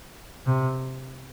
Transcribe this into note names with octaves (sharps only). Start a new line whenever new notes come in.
C3